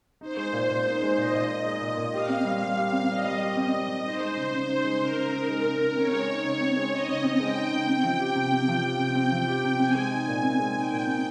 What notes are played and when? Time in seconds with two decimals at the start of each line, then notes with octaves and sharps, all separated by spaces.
0.21 D#4 C5
0.37 G#3
0.53 A#2
0.70 A#2
0.86 D#4
1.02 G#3
1.17 A#2 D#5
1.34 A#2
1.49 D#4
1.66 G#3
1.81 A#2
1.97 A#2
2.13 G4 F5
2.28 C4
2.45 G3
2.61 G3
2.77 G4
2.92 C4
3.09 G3 D#5
3.25 G3
3.40 G4
3.56 C4
3.73 G3
3.88 G3
4.04 D#4 C5
4.20 G#3
4.37 C#3
4.53 C#3
4.69 D#4
4.84 G#3
5.00 C#3 A#4
5.16 C#3
5.33 D#4
5.49 G#3
5.65 C#3
5.80 C#3
5.96 C4 C#5
6.13 G#3
6.28 D#4
6.44 C#3
6.61 C4
6.76 G#3
6.92 D#4 D#5
7.09 C#3
7.24 C4
7.40 G#3 G5
7.56 D#4
7.72 C#3
7.87 C4
8.04 F3
8.20 G4
8.35 C3
8.52 C4
8.68 F3
8.84 G4 G5
8.99 C3
9.15 C4
9.32 F3
9.48 G4
9.64 C3
9.79 C4 G#5
9.95 G#3
10.11 D#4
10.28 A#2
10.43 C4
10.59 G#3
10.75 D#4 G5
10.92 A#2
11.07 C4